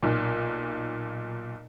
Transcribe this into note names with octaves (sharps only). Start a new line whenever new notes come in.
B1 A#2